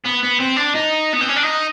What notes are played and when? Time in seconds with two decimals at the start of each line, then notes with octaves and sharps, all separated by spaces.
0.05 B3
0.23 B3
0.40 C4
0.57 D4
0.75 D#4
1.13 B3
1.21 C4
1.29 C#4
1.36 D4
1.43 D#4